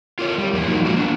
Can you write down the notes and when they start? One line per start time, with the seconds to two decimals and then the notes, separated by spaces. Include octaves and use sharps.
0.19 F4 A#4 C#5
0.38 G3
0.53 E2 F3 A#3
0.67 F3 F#3 A#3 D#4
0.85 G#3 A#3 F4 F#4
0.96 B3 D4